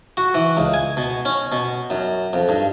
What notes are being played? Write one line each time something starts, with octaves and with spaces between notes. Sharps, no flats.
F#4
E3
C#2
G#5
B2
C#4
B2
F#2
F2
G2